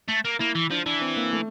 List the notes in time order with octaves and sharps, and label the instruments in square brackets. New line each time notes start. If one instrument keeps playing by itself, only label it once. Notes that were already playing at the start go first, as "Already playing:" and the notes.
[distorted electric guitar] A3
A#3
[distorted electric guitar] A#3 [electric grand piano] E4
[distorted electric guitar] E3
[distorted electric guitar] F3 [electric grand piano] D4
[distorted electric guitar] E3 [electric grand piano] D4
[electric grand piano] C4
A#3
A3